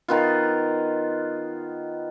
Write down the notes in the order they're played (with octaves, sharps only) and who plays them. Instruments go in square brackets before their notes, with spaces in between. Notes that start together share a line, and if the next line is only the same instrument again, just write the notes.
[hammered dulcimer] D#3 B3 F4